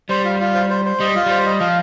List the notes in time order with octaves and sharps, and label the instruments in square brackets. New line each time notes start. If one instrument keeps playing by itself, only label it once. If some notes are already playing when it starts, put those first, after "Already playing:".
[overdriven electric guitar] G3 [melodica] C5
[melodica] F4
F4
C5
C5
C5
[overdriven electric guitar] G3 [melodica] D#5
[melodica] F4
[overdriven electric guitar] G3 [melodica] C5
[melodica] D#5
[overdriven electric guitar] F3 [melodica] F5